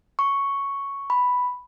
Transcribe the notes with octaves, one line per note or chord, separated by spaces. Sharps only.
C#6
B5